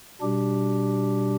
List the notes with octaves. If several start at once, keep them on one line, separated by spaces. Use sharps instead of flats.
B2 G3 D4 G4